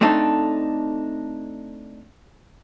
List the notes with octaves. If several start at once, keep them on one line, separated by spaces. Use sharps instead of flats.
A3 C4 D4 D#4 A4